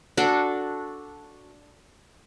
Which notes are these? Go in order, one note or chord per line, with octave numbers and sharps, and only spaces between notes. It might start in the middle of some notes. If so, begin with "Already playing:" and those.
D4 F#4 A4